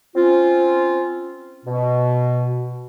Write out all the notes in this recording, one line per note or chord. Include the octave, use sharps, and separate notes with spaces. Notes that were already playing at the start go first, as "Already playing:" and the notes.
C4 C#4 F4
B2